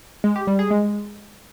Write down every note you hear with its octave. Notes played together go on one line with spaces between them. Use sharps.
G#3
G4
G3
G#4
G#3